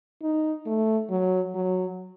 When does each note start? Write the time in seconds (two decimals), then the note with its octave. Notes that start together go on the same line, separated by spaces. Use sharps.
0.22 D#4
0.66 A3
1.10 F#3
1.55 F#3